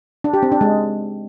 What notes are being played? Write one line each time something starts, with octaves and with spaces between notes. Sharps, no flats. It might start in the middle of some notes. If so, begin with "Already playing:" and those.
D4
G4
C4
D4
G#3